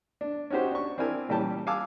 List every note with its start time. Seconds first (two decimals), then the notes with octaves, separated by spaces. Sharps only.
0.21 D4
0.50 C#4 D#4 F#4 G4 C5
0.72 D4 C#6
0.98 C4 D4 E4 A#4 G#5
1.29 A#2 E3 G3 C#4 G5 A5
1.67 F5 G#5 A5 D6 E6